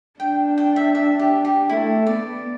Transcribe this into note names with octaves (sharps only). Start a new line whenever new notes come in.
D4 G5
G5
E5
E5
G4
G4
A3 E4
B3 D5